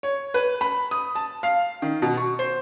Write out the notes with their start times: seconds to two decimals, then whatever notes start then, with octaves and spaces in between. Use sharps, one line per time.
0.03 C#5
0.34 B4
0.61 B5
0.91 D#6
1.15 A5
1.43 F5
1.82 D#3
2.02 B2
2.17 C#6
2.39 C5